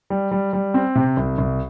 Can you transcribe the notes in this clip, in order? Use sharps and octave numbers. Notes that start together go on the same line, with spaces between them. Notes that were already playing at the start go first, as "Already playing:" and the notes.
G3
G3
G3
C4
C3
C2
C2